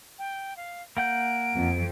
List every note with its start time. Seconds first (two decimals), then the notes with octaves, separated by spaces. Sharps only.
0.19 G5
0.57 F5
0.97 A#3 F#5 G6 D7
1.55 F2